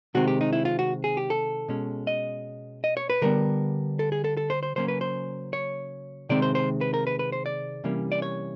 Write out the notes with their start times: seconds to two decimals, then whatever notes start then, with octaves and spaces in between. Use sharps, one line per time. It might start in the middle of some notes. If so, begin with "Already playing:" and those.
0.14 C3 D#3 G#3 C4 F#4
0.27 G4
0.41 D#4
0.53 E4
0.65 F4
0.79 F#4
1.04 G#4
1.17 G4
1.30 A4
1.68 B2 G#3 C#4
2.07 D#5
2.84 D#5
2.97 C#5
3.10 B4
3.22 D3 G3 B3 A#4
3.99 A4
4.12 G#4
4.24 A4
4.37 A4
4.50 C5
4.63 C5
4.76 C#3 F#3 A#3 C#4 C5
4.88 B4
5.01 C5
5.53 C#5
6.29 C3 D#3 G#3 C4 D5
6.42 C5
6.55 C5
6.81 B4
6.94 A#4
7.07 B4
7.19 B4
7.32 C5
7.46 D5
7.84 C3 E3 G3 A#3 C#4
8.12 D5
8.22 C#5